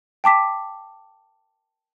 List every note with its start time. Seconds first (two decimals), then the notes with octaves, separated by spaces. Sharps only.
0.24 G5 A5 D6 B6